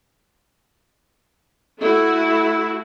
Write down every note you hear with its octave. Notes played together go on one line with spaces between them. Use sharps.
A3 E4 F#4